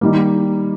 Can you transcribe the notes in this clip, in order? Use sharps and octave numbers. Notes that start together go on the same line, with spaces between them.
D#3 G3 A#3